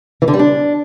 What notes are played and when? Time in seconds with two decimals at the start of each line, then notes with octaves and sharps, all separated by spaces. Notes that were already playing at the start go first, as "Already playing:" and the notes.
0.22 E3
0.28 D3
0.33 G3
0.39 D4